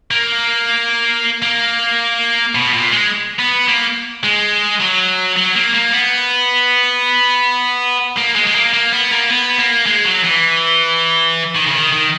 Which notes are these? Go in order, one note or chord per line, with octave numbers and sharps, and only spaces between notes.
A#3
A#3
B2
A#2
G#3
B3
A#3
G#3
F#3
F#3
A#3
A#3
B3
A#3
G#3
G#3
A#3
A#3
B3
A#3
B3
A#3
G#3
F#3
E3
D#3
C#3
D#3
D#3